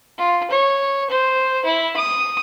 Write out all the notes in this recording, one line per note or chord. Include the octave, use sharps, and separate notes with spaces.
F4
C#5
C5
E4
D#6